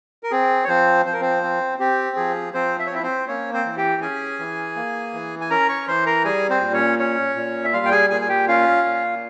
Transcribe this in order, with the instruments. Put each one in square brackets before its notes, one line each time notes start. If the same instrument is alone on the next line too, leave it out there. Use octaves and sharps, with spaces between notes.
[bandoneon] A#4
C4 G#4
C#5
F3 C4 C5
F3 C5
A#4
C4 C5
C4
C4 G4
F3 G#4
F3 C4 C5
E5
C#5
C4
E4 E5
C4 C5
A#3 C#4 C#5
C4 C5
E3
G4 G5
C#4 G#4 G#5
E3
A#3
E3
G#5
C#4 A#4 A#5
C#5 C#6
E3 C5 C6
A#4 A#5
G3 G#4 G#5
C4 C5
A#2
C#4 C#5
C#4 C#5
A#2
E5
G3 F4 F5
G5
G#4 G#5
A#2 G#4 G#5
G#5
G4 G5
C#4 F4 F5
A#2